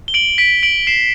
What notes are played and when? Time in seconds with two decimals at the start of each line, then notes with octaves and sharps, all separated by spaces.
0.08 G7
0.14 D7 F#7
0.38 B6 D7
0.63 D7 F#7
0.87 C7 E7